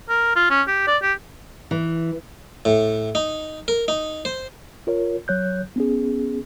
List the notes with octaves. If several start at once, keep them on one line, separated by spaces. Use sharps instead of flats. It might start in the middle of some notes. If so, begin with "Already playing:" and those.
A#4
F4
C#4
G4
D5
G4
E3
A2
D#4
A#4
D#4
C5
F4 A#4 C#5
F#3 C#5 F#6 G6
B3 C#4 G#4